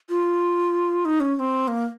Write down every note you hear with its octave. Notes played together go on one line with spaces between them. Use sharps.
F4
D#4
C#4
C#4
C4
A#3